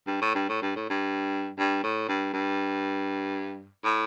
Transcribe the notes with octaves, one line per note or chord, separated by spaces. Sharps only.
G2
A2
G2
A2
G2
A2
G2
G2
A2
G2
G2
A2